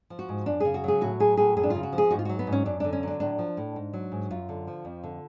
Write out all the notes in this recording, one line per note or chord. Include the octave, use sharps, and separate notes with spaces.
F3
F#4
G#2
F#2 D4
C#3 G#4
F#4
F#3 G#4
A2 F#4
F#3 G#4
A2 G#4
F#2 G#4
D4
C#3 F4
F#4
F3
G#4
G#2 F#4
F4
F#3 F#4
B3
G#2
C#4
F#2 D4
D3 D4
C#4
F#3 D4
A2 D4
F3
A2
G#2
F#3
G#2
F#2 F4
D3
F3
F2
D3